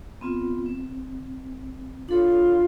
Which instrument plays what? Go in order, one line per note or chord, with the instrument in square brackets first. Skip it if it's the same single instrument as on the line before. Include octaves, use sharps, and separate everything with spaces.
[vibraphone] B3 C4 F4
C4
[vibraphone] D4 A4 C#5 [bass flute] F4